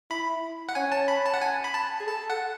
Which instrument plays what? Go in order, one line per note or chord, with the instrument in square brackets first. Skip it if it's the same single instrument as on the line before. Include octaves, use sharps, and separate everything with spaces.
[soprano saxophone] E4 [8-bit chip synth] B5
[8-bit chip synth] F#5
[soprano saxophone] C#4 [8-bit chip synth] G#5
[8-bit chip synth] A5
B5
A5
F#5
G#5
B5
A5
[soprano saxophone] G#4
[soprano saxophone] A4 [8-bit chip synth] A5
[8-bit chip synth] F#5